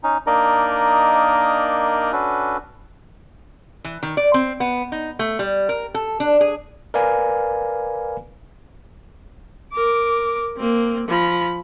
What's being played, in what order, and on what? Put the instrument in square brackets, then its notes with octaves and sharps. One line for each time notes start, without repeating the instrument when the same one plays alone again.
[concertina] C#4 D#4
A#3 D4 D#4 A#4 D5 D#5
C#4 D4 F#4 A4 B4
[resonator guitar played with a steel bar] E3
D#3
D5
C4
B3
D#4
A3
G3
A#4
A4
D4
G#4
[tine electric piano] A#4 B4 D5 F5 G#5 B5
[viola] A#4 D6
A#3 C4
F3 B5